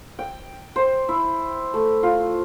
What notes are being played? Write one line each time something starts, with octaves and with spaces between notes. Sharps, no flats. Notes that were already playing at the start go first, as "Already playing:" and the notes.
G5
C5
E4
A3
F4